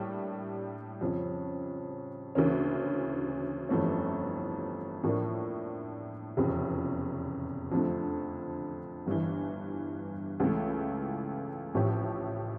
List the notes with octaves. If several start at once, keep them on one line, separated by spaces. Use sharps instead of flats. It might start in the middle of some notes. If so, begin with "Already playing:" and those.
Already playing: A2 G3 A#3 D4 G4
F2 C#3 F3 C#4
D2 C#3 E3 A#3 C#4
G1 F2 E3 A3 C#4
A2 F3 A#3 D4
F1 E2 C#3 F3
F2 D3 F3 A3
G1 G2 E3
C#2 C#3 E3 A3
A1 A2 F3 C#4 G4